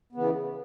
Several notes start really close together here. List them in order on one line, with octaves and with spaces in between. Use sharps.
B3 C#3 E3